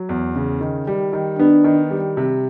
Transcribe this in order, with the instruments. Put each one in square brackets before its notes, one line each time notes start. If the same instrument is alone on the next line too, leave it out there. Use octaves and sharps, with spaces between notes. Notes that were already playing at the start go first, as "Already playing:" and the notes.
Already playing: [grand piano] F#3
E2
C#3
D#3
G3
D#3
[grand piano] B3 [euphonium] D4
[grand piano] D#3
G3
C3